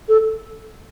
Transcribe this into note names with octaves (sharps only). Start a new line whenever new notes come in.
A4